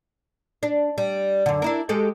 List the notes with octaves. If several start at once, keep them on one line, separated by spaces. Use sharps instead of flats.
D4
G3
F#2 D3
D4 E4 A#4
G#3 G4 A4